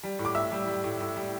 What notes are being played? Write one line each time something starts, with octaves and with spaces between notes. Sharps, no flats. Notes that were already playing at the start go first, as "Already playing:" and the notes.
G3
A2
D6
A2 E5 E6
G3
G3
A2
A2
G3